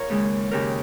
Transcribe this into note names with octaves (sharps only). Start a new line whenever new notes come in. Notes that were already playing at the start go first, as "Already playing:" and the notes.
Already playing: F4 A#4 C#5
D#2 C#3 G#3
D#2 C#3 G#3 G4 A#4